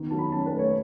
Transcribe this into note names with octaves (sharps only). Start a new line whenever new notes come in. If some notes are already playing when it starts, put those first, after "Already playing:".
Already playing: D#3 B3
F#3 A5
B5
C#4 A5
B4
A3
C#5